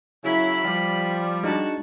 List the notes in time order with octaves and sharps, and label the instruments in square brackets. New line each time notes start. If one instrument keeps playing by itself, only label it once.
[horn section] C#3 F#3 E4 [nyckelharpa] B5
[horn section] F3 G3
[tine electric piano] G#3 D4 D#4 [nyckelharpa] F#4 A5